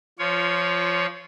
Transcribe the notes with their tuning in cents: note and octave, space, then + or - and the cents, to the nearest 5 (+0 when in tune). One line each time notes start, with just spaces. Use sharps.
F3 -15 F4 +0 C#5 +15